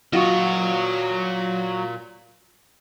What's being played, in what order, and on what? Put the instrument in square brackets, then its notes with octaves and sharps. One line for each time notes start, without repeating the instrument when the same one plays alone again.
[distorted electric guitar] A#2 D#5 [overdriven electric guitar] F#3 C#5 [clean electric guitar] F4 F#4